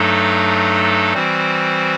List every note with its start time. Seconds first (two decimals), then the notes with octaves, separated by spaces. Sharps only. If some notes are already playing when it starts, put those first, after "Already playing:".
Already playing: G2 F#3 A3 D#4 A4
1.14 E3 G3 C4 F#4 C5